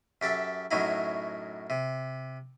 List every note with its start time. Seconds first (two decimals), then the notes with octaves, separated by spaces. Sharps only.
0.22 F#2 G4 A4 E5
0.71 F#2 A2 F#3 D#4 E4
1.70 C3